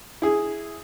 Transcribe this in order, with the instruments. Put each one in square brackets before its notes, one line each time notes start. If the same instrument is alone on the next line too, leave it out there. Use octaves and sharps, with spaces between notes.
[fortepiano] E4 G#4